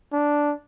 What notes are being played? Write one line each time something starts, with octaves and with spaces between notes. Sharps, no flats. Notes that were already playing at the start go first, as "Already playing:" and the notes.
D4